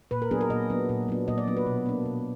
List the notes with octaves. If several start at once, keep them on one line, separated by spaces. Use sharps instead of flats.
A#2 B4
A#4
F#3 B3 D4 G#4
A#4
A#2 D#5
F#3 B3 D4
A#2
F#3 B3 D4
A#2 D#5
D5
F#3 B3 D4
B4
B2
A#3 D4
B2